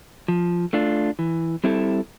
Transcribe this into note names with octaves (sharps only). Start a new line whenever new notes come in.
F3
A3 D4 F4
E3
G3 C4 E4 A4